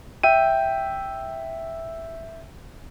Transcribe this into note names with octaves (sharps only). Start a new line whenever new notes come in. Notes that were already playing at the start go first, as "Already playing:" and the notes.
E5 G5 D#7